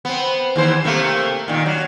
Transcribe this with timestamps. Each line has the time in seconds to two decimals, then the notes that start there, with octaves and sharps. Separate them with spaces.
0.05 B3 C4
0.56 D#2 E3 C5
0.84 C3 A3 A#3
1.48 A#2 D#3
1.66 F#3